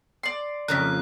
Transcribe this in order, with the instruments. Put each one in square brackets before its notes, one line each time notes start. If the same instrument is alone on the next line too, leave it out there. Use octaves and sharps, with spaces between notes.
[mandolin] D5 C6
[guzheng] F2 C#3 A#4 [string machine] F3 A#3 [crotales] F#6 B6